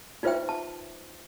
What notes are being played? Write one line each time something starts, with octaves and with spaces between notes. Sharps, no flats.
D#4 F4 B4 C5 E5 G5
A5